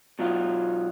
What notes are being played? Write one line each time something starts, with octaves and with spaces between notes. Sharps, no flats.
B2 F#3 F4